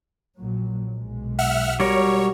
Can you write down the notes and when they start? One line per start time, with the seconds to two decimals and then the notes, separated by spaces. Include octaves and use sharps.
0.39 A#1 A#2 F#3
0.94 B1 G#3
1.39 E5 F#5 F6
1.80 G3 F#4 A#4 C#5